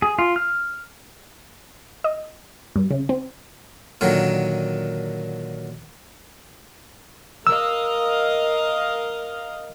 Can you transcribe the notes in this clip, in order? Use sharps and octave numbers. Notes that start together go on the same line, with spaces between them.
G#4
F4
F6
D#5
G2
C#3
C4
A#2 D3 D#3 F#3
A#4 D#5 F5 E6